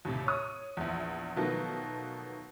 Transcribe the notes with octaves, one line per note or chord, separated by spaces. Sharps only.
D#2 A2 C3
C#5 D#6
A#1 E2
B2 D#3 F3 F#3 A3 B3